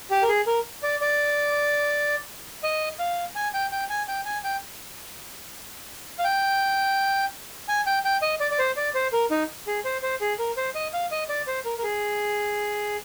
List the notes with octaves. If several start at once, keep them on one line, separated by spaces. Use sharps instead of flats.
G4
A#4
G#4
A#4
D5
D5
D#5
F5
G#5
G5
G5
G#5
G5
G#5
G5
F5
G5
G#5
G5
G5
D#5
D5
D5
C5
D5
C5
A#4
D#4
G#4
C5
C5
G#4
A#4
C5
D#5
F5
D#5
D5
C5
A#4
A#4
G#4